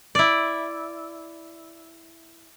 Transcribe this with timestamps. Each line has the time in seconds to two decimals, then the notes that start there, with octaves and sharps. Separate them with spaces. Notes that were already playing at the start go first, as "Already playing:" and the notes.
0.15 E4 D5